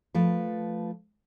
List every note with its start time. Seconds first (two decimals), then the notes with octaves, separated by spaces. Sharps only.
0.14 F3 A3 B4